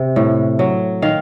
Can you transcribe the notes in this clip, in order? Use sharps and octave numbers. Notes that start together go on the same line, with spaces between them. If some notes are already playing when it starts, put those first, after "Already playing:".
Already playing: C3
A2
F#3
D#3 F5